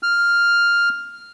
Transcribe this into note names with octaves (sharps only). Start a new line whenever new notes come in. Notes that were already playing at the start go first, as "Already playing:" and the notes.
F6